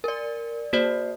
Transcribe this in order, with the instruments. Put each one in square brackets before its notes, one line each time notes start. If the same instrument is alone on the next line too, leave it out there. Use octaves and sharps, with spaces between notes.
[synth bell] A#4 D5
[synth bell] A#3 [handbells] F#4 C5 D5